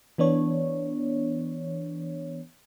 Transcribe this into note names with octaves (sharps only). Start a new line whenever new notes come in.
E3 B3 D4 C#5